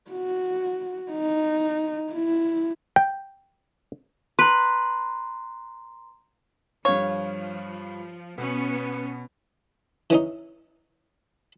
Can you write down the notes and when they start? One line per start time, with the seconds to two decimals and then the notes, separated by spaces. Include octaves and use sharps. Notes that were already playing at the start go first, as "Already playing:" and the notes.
0.11 F#4
1.12 D#4
2.12 E4
2.96 G5
4.39 B4 A#5 C6
6.85 G2 F3 C#5 F5
8.38 B2 B3 C#4
10.10 E3 C#4 D#4